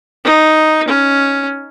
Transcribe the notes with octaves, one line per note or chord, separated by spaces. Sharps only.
D#4
C#4